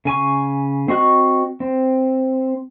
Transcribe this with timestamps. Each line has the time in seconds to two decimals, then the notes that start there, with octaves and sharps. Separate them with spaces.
0.05 C#3 G#5 C#6
0.88 C4 F#4 D#5 C#6 F#6
1.60 C4